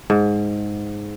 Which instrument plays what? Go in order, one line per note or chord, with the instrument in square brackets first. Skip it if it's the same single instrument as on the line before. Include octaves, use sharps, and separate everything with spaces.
[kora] G#2